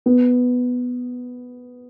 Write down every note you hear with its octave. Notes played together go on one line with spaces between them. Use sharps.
B3